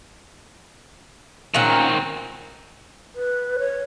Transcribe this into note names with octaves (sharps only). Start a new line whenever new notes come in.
A#2 D#3 C4 C#4 F#5
B4
C#5